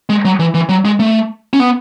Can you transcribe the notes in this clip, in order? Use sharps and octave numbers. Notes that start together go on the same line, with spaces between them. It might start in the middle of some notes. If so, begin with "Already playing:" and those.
G#3
F#3
E3
E3
F#3
G#3
A3
C#4
B3